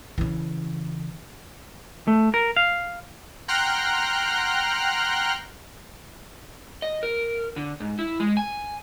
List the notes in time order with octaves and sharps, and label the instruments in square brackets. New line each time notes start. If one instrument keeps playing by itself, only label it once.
[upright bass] C#3 E3
[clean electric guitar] A3
A#4
F5
[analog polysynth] F#5 G5 A#5 C6 F6 F#6
[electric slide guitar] D#5
A#4
D3
G#2
E4
G#3
G#5